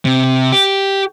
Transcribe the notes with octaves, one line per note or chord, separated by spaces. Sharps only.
C3
G4